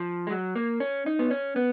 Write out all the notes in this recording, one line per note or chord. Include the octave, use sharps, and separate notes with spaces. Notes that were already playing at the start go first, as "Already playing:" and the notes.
Already playing: F3
G#3
F#3
A#3
C#4
D#4
B3
C#4
B3